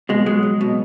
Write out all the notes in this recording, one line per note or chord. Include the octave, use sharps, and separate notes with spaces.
B2 G#3
F#3 G#3
F#3
B2